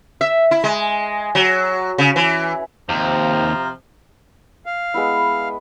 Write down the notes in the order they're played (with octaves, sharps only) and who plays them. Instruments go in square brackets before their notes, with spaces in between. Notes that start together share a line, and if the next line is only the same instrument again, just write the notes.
[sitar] E5
E4
G#3
F#3
C#3
E3
[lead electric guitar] D#2 [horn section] C3 F3 A#5
[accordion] F5
[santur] G#3 B3 E4